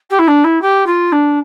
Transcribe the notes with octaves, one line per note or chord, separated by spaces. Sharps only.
G4
E4
D4
E4
G4
F4
D4